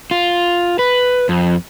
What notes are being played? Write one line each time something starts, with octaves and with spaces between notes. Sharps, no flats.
F4
B4
F2